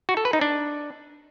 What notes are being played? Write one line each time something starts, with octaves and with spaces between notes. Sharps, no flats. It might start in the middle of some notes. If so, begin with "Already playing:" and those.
F#4
A4
B4
D#4
D4